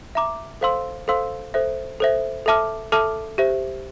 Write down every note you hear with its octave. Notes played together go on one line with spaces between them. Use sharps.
E5 A#5 D6
A4 C5 F5 C6 E6
A4 C5 F5 C6 E6
A4 C5 E5
A4 C5 E5
A4 E5 A5 D6 F6
A4 E5 A5 D6 F6
G4 C5 E5